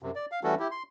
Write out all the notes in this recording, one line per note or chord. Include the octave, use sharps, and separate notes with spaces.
F#2 C3
D5
F5
E3 G3 A3 C#4 F#4 A4
E4 G4
C6